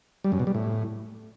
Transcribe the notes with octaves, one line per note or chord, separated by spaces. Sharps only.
G3
F#2
B2
G3
A2